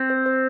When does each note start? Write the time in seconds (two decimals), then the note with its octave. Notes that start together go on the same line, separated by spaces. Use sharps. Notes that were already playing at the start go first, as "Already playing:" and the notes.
Already playing: C4
0.10 C5
0.26 C5